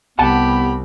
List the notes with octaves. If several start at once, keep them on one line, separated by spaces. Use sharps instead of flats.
C2 B3 G4 F#5 A5 B5